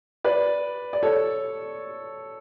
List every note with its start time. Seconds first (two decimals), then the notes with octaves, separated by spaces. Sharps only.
0.24 B4 D5
0.93 D5
1.03 A4 C#5